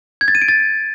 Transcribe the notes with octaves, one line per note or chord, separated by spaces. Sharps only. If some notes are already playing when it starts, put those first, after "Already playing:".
G#6
A6
D#7
D7
A6